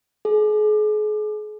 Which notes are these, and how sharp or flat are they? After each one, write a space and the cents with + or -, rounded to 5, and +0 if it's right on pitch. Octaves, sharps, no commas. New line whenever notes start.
G#4 +40